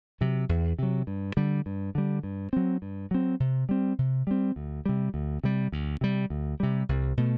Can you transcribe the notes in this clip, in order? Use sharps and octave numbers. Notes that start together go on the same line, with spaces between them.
C3 F#3
E2
C3 F#3
G2
D3 G3
G2
D3 G3
G2
F#3 C4
G2
F#3 C4
C3
G3 C4
C3
G3 C4
D2
C3 G3
D2
C3 G3
D2
C3 G3
D2
C3 G3
C2
B2 A3